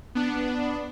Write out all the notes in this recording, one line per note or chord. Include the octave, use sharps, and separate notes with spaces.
B3 D4